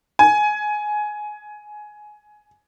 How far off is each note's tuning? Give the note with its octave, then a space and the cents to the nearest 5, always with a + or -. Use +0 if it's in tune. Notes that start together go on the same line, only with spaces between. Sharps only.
G#5 +15